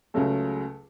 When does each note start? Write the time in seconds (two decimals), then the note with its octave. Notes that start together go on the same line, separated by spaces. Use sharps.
0.14 C#2 C#3 F#3 A3 A4